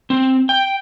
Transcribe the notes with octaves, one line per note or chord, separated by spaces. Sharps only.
C4
G5